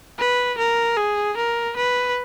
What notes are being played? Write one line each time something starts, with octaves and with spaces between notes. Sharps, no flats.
B4
A#4
G#4
A#4
B4